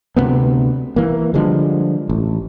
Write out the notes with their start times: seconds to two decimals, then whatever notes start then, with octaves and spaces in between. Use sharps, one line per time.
0.16 D2 C3 A3 B3
0.96 E3 A#3
1.34 D3 F3 G3 G#3
2.09 A1